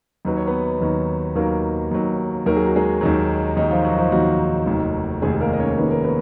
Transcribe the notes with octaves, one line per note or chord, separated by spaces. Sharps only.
D#2 D#3 F#3 B4
C#5
B3 B4
D#2 D#3 F#3
D#2 D#3 F#3 A#3 A#4
D#2 D#3 F#3
D#2 D#3 F#3 A#4
G#4
F#4
G#3 G#4
D#2 D#3 F#3
D#2 D#3 F#3 D#4
F3 F4
F#3 F#4
F3 F4
D#2 D#3 F#3 F#4
F1 D#2 D#3
F1 D#2 D#3 G#3 G#4
G#4
A#3 A#4
D#5
C#4 C#5
F1 D#2 D#3 B4
A#4
B3 B4